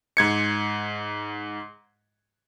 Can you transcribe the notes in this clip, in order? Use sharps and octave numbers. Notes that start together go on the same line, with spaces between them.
G#2 G#6 C#7